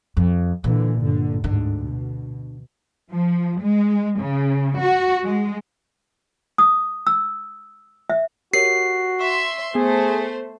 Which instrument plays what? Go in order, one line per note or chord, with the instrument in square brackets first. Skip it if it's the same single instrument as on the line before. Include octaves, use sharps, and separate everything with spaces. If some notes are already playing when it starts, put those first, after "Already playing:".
[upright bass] F2
[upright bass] A#2 [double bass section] D3 E3
[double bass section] G1 D3
[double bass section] D2 G#2 [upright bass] D3
[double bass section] B2
[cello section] F3
G#3
C#3
F#4
G#3
[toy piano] D#6
E6
E5
[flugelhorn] F#4 [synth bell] G4 A#4 C#5 [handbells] C7
[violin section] E5 C6 [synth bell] C#6
[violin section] A3 C5 [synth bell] B3 [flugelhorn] G#4